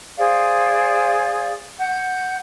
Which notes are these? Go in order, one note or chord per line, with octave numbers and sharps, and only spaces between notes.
G#4 C5 D5 F5
F#5 G6